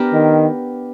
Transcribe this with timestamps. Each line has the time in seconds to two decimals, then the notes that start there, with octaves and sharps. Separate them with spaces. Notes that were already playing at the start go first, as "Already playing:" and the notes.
Already playing: B3 D4 G4 A#4
0.13 D#3